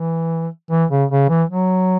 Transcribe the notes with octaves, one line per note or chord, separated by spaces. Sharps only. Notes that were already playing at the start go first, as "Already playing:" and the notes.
Already playing: E3
E3
C#3
C#3
E3
F#3